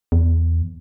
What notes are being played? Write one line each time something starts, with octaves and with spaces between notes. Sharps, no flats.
E2